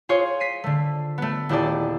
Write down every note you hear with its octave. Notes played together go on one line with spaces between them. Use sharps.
F4 G#4 C5 C#5
B6 C7 D#7
D3 A3
A3 B3
D#1 E4 G4 G#4 D5